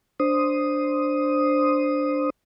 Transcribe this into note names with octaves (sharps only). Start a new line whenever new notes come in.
D4 C5 D#6